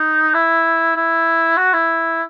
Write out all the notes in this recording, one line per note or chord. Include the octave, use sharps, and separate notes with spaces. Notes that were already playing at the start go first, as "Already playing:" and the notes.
Already playing: D#4
E4
E4
F#4
E4